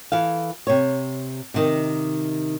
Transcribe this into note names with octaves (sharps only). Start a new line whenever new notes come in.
E3 A4 F5
C3 C#5
C3 D#3 D#4